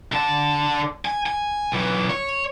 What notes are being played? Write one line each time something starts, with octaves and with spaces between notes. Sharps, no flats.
D3 A5
G#5
G#5
B1 E3
C#5